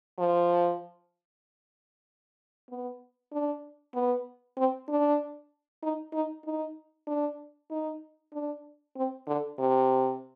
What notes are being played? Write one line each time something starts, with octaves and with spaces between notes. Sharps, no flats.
F3
B3
D4
B3
C4
D4
D#4
D#4
D#4
D4
D#4
D4
C4
D3
C3